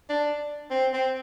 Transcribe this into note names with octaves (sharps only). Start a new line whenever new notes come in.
D4
C4
C4